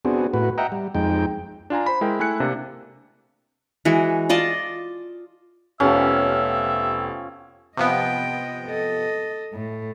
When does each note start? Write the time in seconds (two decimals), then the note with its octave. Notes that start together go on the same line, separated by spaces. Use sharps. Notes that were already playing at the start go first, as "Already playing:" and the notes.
0.05 B3 C4 D4 F#4 G#4
0.34 A2 F#4 B4
0.58 D#5 E5 F#5 G5 A#5
0.72 G3
0.95 F2 G#3 D#4 G5
1.70 D4 F4 G#5 A#5
1.86 C5 B5
2.01 G#3 E4 A#4 G5
2.19 A3 E4 G#5 F#6 C#7
2.40 C3 A#3 D4
3.85 E3 G#3 F#4
4.29 F4 D5 D#5 A5
5.80 F1 F3 B3 C#4 G4 E5
7.77 C3 F3 B3 D#5 G5
8.68 A4 D#5
9.54 A2